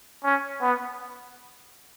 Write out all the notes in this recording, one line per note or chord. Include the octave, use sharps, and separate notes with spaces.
C#4
B3